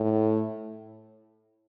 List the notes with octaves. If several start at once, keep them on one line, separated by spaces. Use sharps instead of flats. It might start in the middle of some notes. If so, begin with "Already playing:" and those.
Already playing: A2